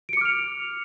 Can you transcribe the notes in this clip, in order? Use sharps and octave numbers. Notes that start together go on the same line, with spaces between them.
D6 F6 C#7 D7 F7